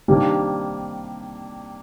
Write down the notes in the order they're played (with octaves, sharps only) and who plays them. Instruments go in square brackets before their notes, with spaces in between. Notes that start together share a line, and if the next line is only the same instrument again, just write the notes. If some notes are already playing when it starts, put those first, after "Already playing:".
[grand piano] C3 D#3 G3 A#3 D4